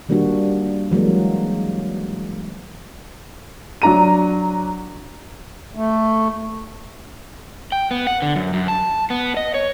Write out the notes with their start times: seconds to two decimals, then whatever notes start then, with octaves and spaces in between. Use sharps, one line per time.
0.09 D#3 G3 A#3 D4 F#4
0.91 E3 F#3 G#3 A#3
3.82 F#3 D4 A#5 D#7
5.75 A3
7.72 G5
7.91 B3
8.07 F#5
8.22 D3
8.36 F#2
8.53 F#2
8.68 A5
9.10 B3
9.37 D#5
9.54 C#5